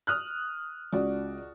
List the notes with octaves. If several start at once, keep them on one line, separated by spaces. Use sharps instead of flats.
D#6 F6 F#6
C#2 F#4 D5